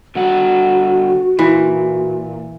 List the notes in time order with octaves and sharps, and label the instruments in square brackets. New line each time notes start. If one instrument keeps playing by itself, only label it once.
[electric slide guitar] D3 G3 F#5 [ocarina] F#4
[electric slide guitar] A#2 [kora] E3